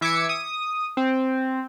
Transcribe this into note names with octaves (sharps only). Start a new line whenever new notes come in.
E3 E5 D6 G#6 C#7
D#6
C4